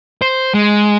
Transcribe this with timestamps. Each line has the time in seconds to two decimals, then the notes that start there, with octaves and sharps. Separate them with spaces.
0.22 C5
0.54 G#3